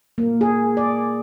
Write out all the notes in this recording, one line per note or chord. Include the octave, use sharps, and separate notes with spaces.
A#3
G#4
D5